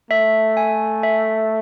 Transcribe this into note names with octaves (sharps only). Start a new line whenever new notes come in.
A3 E5
G#5
E5